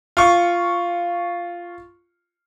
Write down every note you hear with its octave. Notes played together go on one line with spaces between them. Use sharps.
F4 C#6